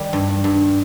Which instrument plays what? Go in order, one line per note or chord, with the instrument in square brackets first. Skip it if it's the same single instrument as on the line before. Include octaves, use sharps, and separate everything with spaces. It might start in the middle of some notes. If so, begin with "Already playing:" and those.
Already playing: [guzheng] D#3 G3
G2
G2